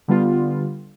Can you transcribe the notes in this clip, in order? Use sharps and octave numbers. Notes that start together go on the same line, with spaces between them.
D3 G3 B3 F4